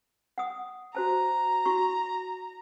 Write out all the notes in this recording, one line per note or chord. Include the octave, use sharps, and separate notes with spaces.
F#5 D#6
F#4 C5 A5 A#5
E4 F#4 C#6